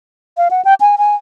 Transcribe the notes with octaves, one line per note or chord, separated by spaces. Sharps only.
F5
F#5
G5
G#5
G#5